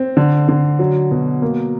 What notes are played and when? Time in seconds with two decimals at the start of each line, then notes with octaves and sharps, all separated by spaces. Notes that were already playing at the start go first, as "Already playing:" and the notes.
Already playing: C4
0.17 D3
0.48 D3
0.79 F#3
1.11 B2
1.42 A#3